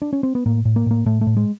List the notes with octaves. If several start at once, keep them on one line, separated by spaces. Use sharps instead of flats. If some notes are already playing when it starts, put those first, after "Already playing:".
D4
C#4
C4
B3
A2 A#3
A2
A#3
A2 A#3
A2 A3
A3
A2
G#3